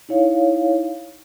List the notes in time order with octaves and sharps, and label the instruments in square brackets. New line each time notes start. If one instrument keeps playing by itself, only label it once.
[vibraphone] D#4 E4 C#5 F5